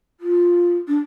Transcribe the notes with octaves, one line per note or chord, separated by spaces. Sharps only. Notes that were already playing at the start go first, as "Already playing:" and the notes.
F4
D4